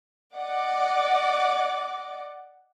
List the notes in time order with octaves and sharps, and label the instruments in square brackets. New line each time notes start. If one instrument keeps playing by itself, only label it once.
[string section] D5 D#5 F#5 D6